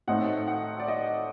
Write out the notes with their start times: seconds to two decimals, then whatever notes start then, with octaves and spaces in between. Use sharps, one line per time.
0.08 A2 A3 C4 D#4 F#5
0.48 F#5
0.80 D5
0.88 D#5